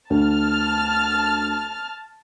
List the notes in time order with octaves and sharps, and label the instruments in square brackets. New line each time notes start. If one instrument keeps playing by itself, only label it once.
[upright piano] D2 [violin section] A5 F6